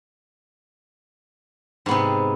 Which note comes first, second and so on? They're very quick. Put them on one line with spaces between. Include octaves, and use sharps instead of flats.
G#2 B3 C3